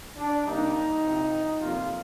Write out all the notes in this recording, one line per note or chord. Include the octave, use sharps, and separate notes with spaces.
D4
C3 G3 A#3 D4 D#4
C2 C3 F3 C4
F2 C3 G3 A#3 F4